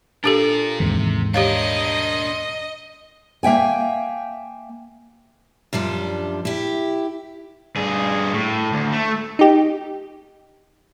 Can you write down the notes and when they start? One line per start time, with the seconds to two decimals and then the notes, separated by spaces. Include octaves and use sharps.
0.24 D4 F4 G4 A4 A#4
0.80 D#2 G#2 C3 E3
1.34 D4 G4 A#4 C#5 D#5 F5
3.43 A#3 E5 G5 G#5
5.73 F#2 F3 G3 D4
6.45 E4 G4
7.76 G2 G#4
8.33 A2
8.73 D2
8.92 A3
9.39 D#4 G4